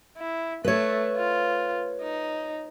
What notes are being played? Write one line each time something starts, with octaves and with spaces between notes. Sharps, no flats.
E4
A3 B4 C#5
F4
D#4